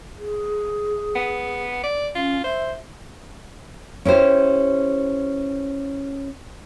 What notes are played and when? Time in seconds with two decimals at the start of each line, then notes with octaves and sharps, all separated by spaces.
0.17 G#4
1.15 B3
1.83 D5
2.15 C#4 F4
2.44 C5 E5
4.05 C#4 E4 G4 C5